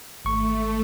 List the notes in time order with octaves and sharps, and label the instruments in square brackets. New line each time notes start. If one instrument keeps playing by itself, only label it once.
[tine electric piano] G#1 C#6 [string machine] A3